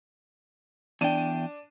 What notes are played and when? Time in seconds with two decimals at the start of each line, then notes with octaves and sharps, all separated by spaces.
1.01 E2 D4 G5 D#7